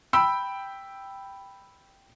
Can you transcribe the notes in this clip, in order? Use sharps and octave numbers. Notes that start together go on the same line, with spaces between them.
G5 B5 E6